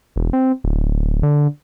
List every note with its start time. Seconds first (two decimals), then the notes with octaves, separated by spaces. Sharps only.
0.16 E1
0.33 C4
0.64 D1
1.23 D3